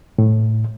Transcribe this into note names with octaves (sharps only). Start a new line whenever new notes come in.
A2